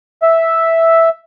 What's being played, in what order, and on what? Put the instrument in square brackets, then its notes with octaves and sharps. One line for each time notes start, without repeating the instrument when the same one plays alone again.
[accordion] E5